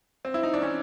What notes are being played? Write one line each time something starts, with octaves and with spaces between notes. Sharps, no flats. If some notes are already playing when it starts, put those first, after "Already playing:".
C4
E4
D#4
D4
C#4